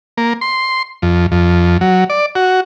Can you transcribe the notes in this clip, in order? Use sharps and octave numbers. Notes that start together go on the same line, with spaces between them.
A#3
C6
F2
F2
F#3
D5
F#4